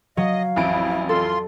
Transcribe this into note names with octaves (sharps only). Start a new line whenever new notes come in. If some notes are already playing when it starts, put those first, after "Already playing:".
F#3 D#5 F5
A1 F2 E4 D7
F4 A4 C6